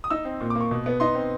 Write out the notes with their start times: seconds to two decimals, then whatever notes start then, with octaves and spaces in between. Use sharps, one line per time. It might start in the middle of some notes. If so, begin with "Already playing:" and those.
0.04 D#6
0.10 D#4 E6
0.25 C4
0.40 A#2
0.50 D6
0.55 A#3
0.61 C#6
0.71 B2
0.86 B3
1.00 D#4 C6
1.15 C4